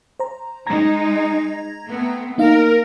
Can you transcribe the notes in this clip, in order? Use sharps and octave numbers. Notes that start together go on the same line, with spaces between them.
C5 A#5
G#3 D#4 A#5 G#6 A#6
A3 B3 C4
A#3 D#4 A#4 F5